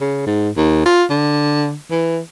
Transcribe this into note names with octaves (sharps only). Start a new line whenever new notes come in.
C#3
G#2
D#2
F4
D3
E3